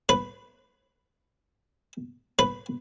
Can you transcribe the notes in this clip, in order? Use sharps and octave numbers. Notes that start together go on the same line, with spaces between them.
B4
B4